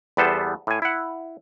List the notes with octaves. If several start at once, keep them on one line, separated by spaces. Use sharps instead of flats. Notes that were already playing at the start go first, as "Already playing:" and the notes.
E2 G3 B3 A4 C5
A2 G#5
E4 F#5